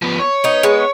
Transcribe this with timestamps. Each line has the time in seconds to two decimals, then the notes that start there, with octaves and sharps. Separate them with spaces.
0.02 F3 B3
0.19 C#5
0.44 B3 D#4
0.63 G#3 B3